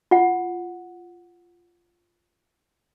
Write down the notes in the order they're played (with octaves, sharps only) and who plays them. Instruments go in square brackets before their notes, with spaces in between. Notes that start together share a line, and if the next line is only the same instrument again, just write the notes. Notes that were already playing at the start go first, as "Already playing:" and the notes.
[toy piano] F4 F#5